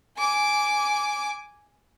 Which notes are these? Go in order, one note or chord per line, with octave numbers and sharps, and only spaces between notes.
G#5 D6